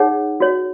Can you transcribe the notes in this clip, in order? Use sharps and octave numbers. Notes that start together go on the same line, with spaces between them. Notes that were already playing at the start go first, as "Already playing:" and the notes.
Already playing: D#4 G#4 C#5 F#5
F#4 C#5